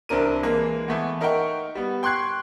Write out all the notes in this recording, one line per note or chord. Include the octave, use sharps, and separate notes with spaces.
C2 C4 D4 A#4 D#7
E3 G#3 A#3
E3 A3 B3
D#4 A#4 E5 F#5 G5 C#6
G3 B3
G5 C6 C#6 F#6 G#6 C7